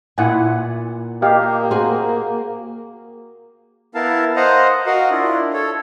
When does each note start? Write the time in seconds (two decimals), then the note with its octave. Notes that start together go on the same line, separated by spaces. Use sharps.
0.18 A#2 E4 F#5 G#5
1.22 A#3 G4 D#5 F5
1.71 F#4 G#4 C5
3.95 B3 E4 A#4 F5 A5
4.36 C5 D#5 F5 F#5 A#5
4.86 F#4 A#4 D#5 F5 F#5
5.10 D4 E4 F4
5.53 A4 C#5